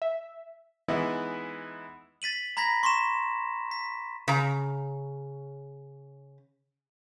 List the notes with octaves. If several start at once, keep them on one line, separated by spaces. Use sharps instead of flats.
E5
E3 G#3 B3 D#4 E4
A6 B6 D#7 F#7
A#5 B5 G#6 A#6 B6
C6 C#6 B6 E7
B6
C#3 A#5